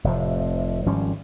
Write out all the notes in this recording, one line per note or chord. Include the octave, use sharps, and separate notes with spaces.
F1 A2 C3 F3
G#1 F3 G3 C#4